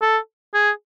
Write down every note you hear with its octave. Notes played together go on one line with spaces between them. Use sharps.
A4
G#4